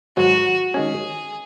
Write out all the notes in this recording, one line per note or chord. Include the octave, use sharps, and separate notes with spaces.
G#2 D#3 F#3 F#4
D#3 G#3 C#4 G#4